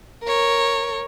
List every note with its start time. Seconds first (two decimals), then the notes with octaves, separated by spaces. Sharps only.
0.23 A#4 C#5